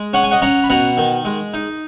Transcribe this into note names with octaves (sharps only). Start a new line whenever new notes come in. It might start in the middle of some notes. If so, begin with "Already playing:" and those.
Already playing: G#3
C#4 F#5
G#5
D#5 F#5
C#4 F#5 A#5
B5
B2 F#5 A#5
D#3
G#3
D#4